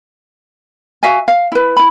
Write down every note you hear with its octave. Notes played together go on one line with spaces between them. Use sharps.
F#4 E5 F5 G#5
F5
E4 B4
E4 B5